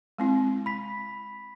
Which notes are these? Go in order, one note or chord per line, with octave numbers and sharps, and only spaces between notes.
G#3 C4 E4
B5 B6